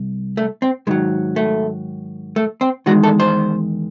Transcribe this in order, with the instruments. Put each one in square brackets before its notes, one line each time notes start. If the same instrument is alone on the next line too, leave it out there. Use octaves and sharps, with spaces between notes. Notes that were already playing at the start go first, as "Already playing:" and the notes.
Already playing: [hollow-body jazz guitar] C2
A3
C4
G#2 D#3 F#3 G#3
A3
A3
C4
E2 D#3 G#3 F#4
A4
C5